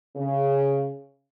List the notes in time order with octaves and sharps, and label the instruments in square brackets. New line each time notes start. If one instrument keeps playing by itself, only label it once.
[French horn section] C#3